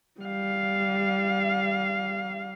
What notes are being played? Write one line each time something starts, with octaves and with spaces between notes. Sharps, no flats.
G3 F5